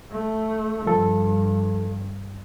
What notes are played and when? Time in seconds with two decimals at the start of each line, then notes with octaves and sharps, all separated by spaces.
0.10 A3
0.86 G2 F3 A4